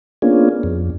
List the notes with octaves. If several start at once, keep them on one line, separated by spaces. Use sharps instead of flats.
A#3 B3 C#4 D4 F4 G#4
F2